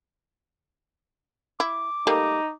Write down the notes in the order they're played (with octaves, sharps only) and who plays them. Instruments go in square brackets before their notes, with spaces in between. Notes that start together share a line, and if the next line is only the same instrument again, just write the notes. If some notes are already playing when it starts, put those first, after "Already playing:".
[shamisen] E4 [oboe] D6
[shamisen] G3 A3 A#3 [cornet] D#4